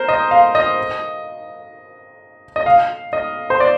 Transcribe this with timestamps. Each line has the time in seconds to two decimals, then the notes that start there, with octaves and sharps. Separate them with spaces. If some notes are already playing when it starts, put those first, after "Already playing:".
Already playing: A#4 C5
0.08 D#5
0.31 F5
0.55 D#5
2.56 D#5
2.66 F5
3.13 D#5
3.50 C5
3.60 D5